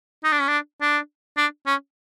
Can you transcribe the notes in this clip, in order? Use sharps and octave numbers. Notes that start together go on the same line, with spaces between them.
D#4
D4
C#4
D4
D4
D4
C#4